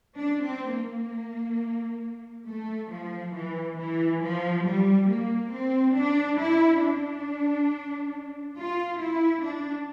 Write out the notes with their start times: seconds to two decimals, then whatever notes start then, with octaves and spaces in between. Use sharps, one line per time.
0.18 D4
0.46 C4
0.75 A#3
2.49 A3
2.92 F3
3.36 E3
3.79 E3
4.23 F3
4.67 G3
5.10 A#3
5.53 C4
5.98 D4
6.41 E4
6.84 D4
8.57 F4
9.01 E4
9.44 D4